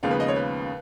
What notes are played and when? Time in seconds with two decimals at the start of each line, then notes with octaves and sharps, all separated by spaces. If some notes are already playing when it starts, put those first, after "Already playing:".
0.03 D#2 C#3 F3 G#3 B3 F5
0.11 B4
0.20 D#5
0.28 C#5
0.36 B4